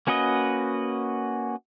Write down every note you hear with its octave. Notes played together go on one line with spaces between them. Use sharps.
A#3 C#4 F#4 B4 D#5